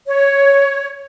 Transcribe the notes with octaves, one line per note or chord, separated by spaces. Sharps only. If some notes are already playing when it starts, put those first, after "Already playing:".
C#5